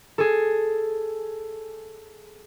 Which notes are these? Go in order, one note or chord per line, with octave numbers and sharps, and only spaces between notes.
G#4 A4